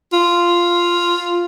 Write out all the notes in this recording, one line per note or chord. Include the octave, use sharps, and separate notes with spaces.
F4